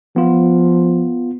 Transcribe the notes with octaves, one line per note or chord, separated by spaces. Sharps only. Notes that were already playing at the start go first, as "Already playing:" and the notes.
F3 B3 F4